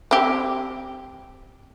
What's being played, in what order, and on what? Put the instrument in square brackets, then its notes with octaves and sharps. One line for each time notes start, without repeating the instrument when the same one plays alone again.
[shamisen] C4 G4